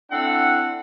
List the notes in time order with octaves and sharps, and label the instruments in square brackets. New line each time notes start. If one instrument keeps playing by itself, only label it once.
[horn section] C4 D4 E4 A4 F#5